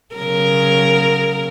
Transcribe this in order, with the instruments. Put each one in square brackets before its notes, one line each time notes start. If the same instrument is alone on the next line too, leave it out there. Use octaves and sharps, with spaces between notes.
[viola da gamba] C#3 F#3 A#4